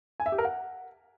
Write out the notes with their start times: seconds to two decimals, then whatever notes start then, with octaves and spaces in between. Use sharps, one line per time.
0.20 G#5
0.26 E5
0.32 G4
0.38 A#4
0.45 F#5